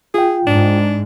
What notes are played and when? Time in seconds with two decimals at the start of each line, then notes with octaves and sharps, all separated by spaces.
0.14 F4 G#4 G5
0.47 G#2 D4